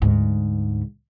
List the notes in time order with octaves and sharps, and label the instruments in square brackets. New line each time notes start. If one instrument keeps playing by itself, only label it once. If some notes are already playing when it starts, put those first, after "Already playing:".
[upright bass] D2 G#2